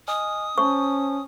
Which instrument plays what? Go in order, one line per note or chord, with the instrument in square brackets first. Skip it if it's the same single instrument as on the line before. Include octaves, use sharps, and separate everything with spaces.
[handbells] D#5 G#5 F6 [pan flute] D#6
[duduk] C#4 [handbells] C5 A5 [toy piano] C#6